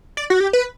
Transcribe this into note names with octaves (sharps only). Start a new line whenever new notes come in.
D5
F#4
G4
B4